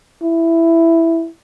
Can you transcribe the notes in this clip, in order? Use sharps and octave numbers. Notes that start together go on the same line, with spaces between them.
E4